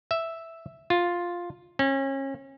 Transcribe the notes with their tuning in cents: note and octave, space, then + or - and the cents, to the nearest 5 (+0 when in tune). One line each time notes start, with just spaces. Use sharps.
E5 +0
F4 +5
C#4 -35